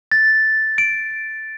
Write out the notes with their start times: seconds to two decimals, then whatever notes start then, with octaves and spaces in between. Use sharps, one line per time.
0.12 A6
0.78 D7